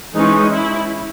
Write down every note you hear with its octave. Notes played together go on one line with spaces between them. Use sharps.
E3 G#3 C#4 D#4
E4